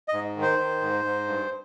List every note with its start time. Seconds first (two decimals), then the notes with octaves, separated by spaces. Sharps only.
0.08 D#5
0.13 G#2
0.37 D#3
0.42 C5
0.59 D#3
0.82 G#2
1.05 G#2
1.27 G2